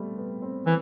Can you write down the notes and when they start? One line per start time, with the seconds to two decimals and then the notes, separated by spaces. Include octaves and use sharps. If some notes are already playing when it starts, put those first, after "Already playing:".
Already playing: G3 A3 B3 C4
0.18 B3
0.42 C4
0.66 E3